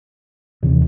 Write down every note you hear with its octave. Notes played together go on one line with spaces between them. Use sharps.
D#2 C3 E3 C4